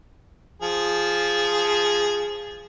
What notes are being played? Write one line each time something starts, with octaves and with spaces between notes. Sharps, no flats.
F3 G#4